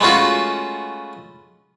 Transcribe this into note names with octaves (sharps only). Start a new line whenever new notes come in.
G#3 A3 B3 C#4 F4 F#4